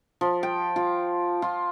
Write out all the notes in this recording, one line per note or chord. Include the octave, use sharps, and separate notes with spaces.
F3
G5
F4
F4